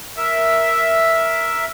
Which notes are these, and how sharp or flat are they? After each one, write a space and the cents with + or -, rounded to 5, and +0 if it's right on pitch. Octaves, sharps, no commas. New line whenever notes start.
A#4 +0 E5 +0